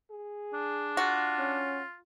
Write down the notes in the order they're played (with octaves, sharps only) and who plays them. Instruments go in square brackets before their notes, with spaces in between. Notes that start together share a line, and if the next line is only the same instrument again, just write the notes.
[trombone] G#4
[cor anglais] D4
[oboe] F4 [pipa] F#4
[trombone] C#4